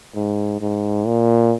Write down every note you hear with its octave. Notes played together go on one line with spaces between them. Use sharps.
G#2
G#2
A#2